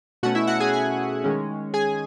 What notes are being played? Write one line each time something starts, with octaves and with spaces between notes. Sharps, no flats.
B2 A3 C#4 F#4 F#5
E4 E5
F#4 F#5
G#4 G#5
G#4 G#5
D#3 G#3 C#4
G#4 G#5